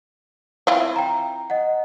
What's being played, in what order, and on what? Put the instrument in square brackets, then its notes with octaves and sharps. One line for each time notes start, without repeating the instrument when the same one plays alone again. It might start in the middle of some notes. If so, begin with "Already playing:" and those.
[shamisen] C4 E4 F4
[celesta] G5 A#5
D#5 F#5